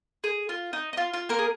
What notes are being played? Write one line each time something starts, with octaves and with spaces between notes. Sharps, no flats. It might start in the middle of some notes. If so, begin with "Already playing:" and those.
G#4
F4
D#4
D#4
F4
F4
A#3 A#4
G#4